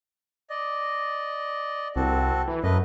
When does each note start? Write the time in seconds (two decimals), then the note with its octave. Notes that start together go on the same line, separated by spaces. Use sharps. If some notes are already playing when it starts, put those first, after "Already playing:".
0.50 D5 D#5
1.96 C2 C4 F#4 A4
2.48 E3
2.63 F#2 A3 B4 D#5